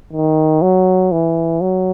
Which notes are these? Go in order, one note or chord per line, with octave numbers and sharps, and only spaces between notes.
D#3
F#3
E3
F#3